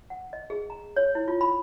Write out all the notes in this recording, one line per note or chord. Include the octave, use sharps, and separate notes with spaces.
F#5
D#5
G#4
A#5
C#5
E4
F4
B5